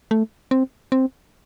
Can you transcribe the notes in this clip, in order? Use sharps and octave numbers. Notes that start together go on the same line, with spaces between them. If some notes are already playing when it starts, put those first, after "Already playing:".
A3
C4
C4